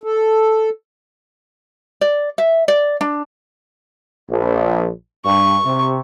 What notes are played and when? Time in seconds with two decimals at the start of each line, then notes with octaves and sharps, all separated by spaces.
0.04 A4
2.01 D5
2.38 E5
2.68 D5
3.01 D4
4.29 A#1
5.25 G2 C#6
5.65 C3